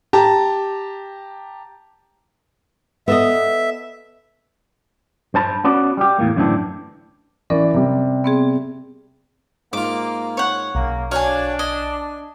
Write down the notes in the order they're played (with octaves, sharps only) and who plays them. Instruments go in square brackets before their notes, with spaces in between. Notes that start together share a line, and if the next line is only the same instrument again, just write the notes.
[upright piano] G4 A5 A#5
[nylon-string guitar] B3 A4 D#5 [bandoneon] E5
[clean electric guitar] G2 C5 A5 B5
B3 C#4 F#4 D5
G3 G4
E2 A2 A#3
F#2 A2 D3 E3 C4 D4
[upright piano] E3 D5 [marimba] C#4 A#4
[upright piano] C3 G3
[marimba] B3 C4 G#4
[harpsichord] G#2 F4 [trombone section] A#3 [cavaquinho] D6
[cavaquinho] C#5 F#5
[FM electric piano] B1 [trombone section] C#3 A#3
[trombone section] D4 [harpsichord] F#4 C#5 [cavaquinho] F5 G#5
[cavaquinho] D#5 [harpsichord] G#5